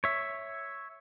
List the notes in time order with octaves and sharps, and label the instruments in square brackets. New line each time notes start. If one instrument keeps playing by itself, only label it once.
[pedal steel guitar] C#5 E5